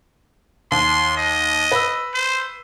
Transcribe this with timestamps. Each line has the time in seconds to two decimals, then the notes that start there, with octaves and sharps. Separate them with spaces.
0.71 D#2 C6
1.17 D#5
1.72 B4 E6
2.14 C5